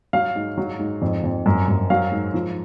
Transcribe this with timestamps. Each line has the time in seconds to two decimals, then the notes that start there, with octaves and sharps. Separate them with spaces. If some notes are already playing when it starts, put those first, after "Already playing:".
0.13 F#3 F5
0.36 G#2
0.58 F#3
0.79 G#2
1.02 F2
1.24 F2
1.46 F#2
1.68 F#2
1.90 F#3 F5
2.12 G#2
2.34 F3